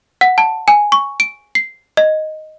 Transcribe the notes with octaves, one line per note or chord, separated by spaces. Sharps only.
F#5
A5
G#5
C#6
D7
C7
D#5